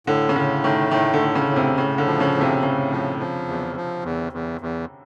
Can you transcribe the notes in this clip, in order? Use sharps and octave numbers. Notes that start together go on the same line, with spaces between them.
A2 D3
C#3
A2 D3
D#3 A3
A2 D#3
D3
A2
C#3
A2
C3
A2 C#3
D3
F3
C#3
A2
C3
A2 C#3
F3
F3
E2
F3
E2
E2
E2